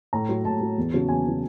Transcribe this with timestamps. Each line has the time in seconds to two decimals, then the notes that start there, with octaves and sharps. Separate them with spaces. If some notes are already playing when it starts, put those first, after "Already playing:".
0.13 A2 A#5
0.29 F#3
0.45 A2 A5
0.61 F#3
0.78 E2
0.94 C#3 F#3
1.09 E2 G#5
1.25 C#3 F#3